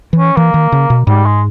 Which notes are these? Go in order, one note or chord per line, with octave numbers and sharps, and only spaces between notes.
E3
C#4
E3 A#3
D#3
C#3
B2
G#2 G3
G#3